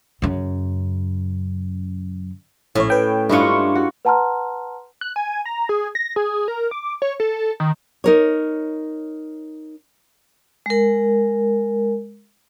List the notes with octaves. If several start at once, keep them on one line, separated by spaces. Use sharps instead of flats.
F#2 C#3
A#1 A2 C#4 C#5
B4 G5
G2 G#3 D4 E4 F4 B4 D#5 C#6
F#4
B4 F#5 A5 A#5 C6 F6
F#6
G#5
A#5
G#4
A#6
G#4
A#4
D6
C#5
A4
D#3
D#4 A#4 C#5
G#3 A#4